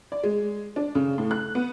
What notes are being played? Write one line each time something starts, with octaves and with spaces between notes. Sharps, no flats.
D5
G#3
D4
C#3
A2
F#6
B3